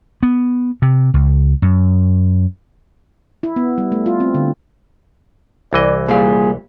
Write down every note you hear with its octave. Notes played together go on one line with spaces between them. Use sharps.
B3
C3
C#2
F#2
E4
B3
G3
A3
F4
C4
D3
C2 E3 D5 D#5
A#2 G3 G#4 F5